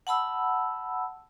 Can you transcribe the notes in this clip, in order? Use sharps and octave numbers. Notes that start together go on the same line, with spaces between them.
F#5 A5 B5 E6